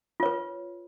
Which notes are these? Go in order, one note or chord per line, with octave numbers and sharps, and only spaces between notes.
F4 B4 C#5